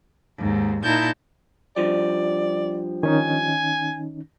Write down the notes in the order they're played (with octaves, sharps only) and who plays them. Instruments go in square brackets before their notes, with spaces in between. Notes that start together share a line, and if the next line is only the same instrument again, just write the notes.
[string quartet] D#2 G#2
A#2 D#4 E4 A5 G6
[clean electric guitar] G2 F3 G3 [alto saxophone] D5
[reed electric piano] D#3 C#4 D#4 [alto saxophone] G#5